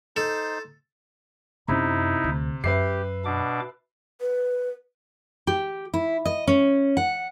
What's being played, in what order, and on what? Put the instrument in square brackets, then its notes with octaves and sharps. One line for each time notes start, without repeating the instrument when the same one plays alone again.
[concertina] D#4 C5 [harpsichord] A4
[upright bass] F#2 C#4 [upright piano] C3 [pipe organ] D#4 E4
[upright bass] D2
[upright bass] F#2 [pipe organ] G4 [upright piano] B4 E5 C7
[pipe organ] B2 D4 D6
[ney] B4
[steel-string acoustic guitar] G4
E4
D#5
C#4
F#5